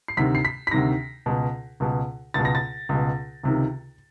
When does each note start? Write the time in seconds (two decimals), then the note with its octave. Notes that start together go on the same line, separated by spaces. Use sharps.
0.08 C7
0.17 D2 C3 D#3 B6
0.35 C7
0.45 B6
0.67 B6
0.71 D2 C3 D#3 A#6
1.26 C#2 B2
1.80 C#2 B2
2.34 C#2 B2 A6
2.45 A#6
2.55 A6
2.89 C#2 B2
3.43 C#2 C3 D#3